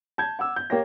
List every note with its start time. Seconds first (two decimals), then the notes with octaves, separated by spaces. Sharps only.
0.18 A5 G6 G#6
0.39 F#5 D6 E6
0.56 G6
0.70 A#3 G4 C#5 G5 A#6